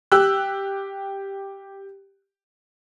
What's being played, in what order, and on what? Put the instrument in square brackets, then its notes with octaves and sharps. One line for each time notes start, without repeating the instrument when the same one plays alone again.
[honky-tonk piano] G4 E6 F#6